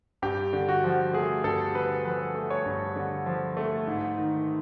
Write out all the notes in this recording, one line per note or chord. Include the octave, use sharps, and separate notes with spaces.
G2 G4
D3
F#4
F3
A3 G#4
G2 A4
D3 B4
F3 B4
A3
C#5
G2
D3
F3
A3
G#2
D#3